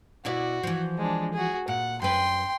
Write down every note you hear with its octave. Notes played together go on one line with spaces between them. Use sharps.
B2 E4 F#4 D5
E3 F3
G#3 D4
F#4 G#4
A#2 F#5
F#2 B4 G5 C6